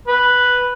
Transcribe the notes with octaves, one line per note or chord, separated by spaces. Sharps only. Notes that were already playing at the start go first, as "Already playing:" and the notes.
B4